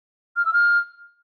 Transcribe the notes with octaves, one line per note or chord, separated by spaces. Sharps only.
F6
E6
F6